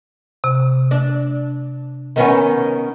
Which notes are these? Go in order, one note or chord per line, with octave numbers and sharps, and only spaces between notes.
C3
D4
D#3 B3 C#4